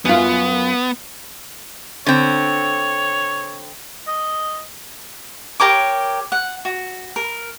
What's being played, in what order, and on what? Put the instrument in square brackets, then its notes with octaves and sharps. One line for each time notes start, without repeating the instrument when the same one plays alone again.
[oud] F#2 F4 [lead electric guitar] B3
[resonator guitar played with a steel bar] D3 C4 [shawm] C#5
[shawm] D#5
[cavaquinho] G4 A#4 C#5 D6
F#5
F#4
A#4